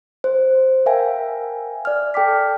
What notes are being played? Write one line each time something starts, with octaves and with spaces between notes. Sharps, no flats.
C5
A#4 E5 F5 G5 G#5
D5 F6
A4 G5 A5 D6 B6